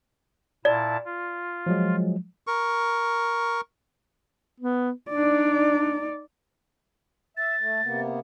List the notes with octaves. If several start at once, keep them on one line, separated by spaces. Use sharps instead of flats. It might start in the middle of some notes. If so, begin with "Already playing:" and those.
A#2 E4 D5 A5
F4
F3 F#3 G#3
A#4 C#6
B3
D4 D#4 D5
E5 A6
A3
C3 A#3 B3